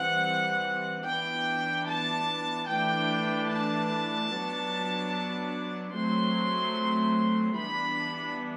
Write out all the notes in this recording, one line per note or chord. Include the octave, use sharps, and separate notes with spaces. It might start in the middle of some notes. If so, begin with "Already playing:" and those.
Already playing: E3 G3 C4 F#5
E3 B3 D4 G5
A5
E3 A3 D4 G5
A5
F#3 B3 D4
F#3 A3 C4 C6
E3 G3 B3 D4 B5